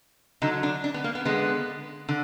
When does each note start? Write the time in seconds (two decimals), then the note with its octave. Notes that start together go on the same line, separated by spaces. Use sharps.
0.42 D3 F#3 D#4
0.63 D4
0.84 D4
0.94 B3
1.04 A#3
1.15 B3
1.25 D3 G#3 B3
2.09 D3